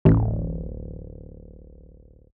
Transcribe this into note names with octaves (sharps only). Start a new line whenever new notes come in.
D1 A1